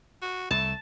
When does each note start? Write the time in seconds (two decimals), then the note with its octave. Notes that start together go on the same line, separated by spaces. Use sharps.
0.22 F#4
0.51 C2 A3 A5 E7